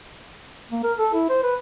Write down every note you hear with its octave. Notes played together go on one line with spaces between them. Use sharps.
A#3
A#4
A4
E4
C5
B4